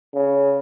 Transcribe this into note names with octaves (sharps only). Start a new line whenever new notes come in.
C#3